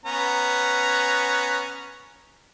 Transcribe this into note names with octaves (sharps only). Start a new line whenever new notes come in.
B3 C#4 A#5